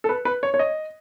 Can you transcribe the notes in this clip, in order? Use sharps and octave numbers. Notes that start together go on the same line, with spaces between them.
A4
B4
B4
C#5
C#5
D#5